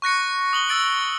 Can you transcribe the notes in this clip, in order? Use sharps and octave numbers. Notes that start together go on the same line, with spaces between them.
C#6 F#6 A#6 C#7
D#6 F#7 G7
E6 A6 D7 F#7